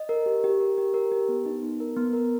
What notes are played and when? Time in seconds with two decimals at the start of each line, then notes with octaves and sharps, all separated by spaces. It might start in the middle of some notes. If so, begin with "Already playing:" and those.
Already playing: D#5
0.09 A#4
0.26 G4
0.44 G4
0.60 A#4
0.78 G4
0.94 A#4
1.11 G4
1.29 B3
1.46 D#4
1.62 B3
1.80 A#4
1.97 B3
2.13 A#4